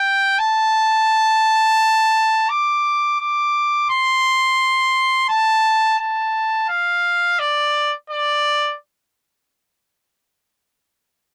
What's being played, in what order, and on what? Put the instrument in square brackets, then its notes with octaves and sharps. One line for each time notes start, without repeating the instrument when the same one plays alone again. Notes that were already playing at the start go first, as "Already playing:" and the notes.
Already playing: [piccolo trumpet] G5
A5
D6
D6
C6
A5
A5
F5
D5
D5